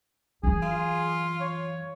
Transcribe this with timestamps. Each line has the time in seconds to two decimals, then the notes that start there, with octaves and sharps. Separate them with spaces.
0.43 F#2 E3 G#4
0.63 F4
1.41 C#5